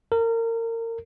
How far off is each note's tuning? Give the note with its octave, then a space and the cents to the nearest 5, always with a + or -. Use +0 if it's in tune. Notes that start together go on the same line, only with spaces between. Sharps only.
A#4 -30